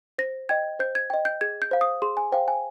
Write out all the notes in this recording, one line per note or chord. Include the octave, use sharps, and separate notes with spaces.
C5 A#6
D#5 G5 G#6
C5 G6
G#6
D#5 G5
G6
G#4 G#6
G6
C5 F5
D#6
G#4 C6
G#5
C5 F5 G5
G#5